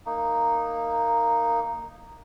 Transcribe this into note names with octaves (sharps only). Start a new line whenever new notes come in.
A#3 D#4